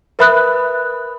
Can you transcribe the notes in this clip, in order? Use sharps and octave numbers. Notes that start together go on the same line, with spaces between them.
A#4 B4 E5 B5 D#6 F#6